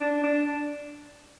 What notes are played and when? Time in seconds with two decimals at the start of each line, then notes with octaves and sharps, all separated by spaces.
0.01 D4
0.23 D4